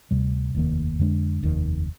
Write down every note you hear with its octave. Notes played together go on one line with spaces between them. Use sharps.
D2 C3 G3
F1 D#2 D#3 A#3
F2 D3 G#3 D4
F1 D#2 D#3